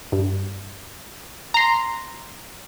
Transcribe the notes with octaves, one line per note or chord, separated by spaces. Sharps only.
G2
A#5 C6